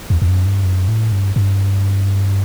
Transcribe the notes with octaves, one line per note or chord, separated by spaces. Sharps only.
E2
E2
F#2
G2
F#2
A2
G2
G2